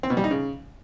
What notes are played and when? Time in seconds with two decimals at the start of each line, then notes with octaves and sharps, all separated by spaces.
0.03 C4
0.10 B2
0.17 G3
0.24 D#4
0.31 C#3